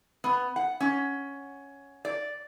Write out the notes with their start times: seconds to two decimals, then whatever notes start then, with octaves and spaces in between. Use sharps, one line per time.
0.24 B3
0.56 F#5
0.80 C#4
2.05 D5